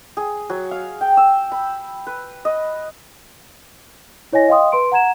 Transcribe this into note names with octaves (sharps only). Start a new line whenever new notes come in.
G#4
F#3
F5
G5
E6
B5
B4
D#5
E4 C#5 D#5 G#5 A#6
D#5 F5 G5 C6 D#6
B4 C6 D7
F#5 A#5 G#6 E7